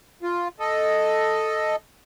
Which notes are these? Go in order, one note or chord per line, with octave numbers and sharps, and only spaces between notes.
F4
A4 D#5